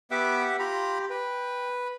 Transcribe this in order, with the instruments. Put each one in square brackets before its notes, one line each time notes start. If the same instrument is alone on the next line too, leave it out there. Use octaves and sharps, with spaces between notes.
[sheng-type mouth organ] B3 D6 [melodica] G4 E5 F#5
[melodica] F4 A#5 B5 [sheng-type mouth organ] G4
[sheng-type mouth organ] B4 [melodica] G5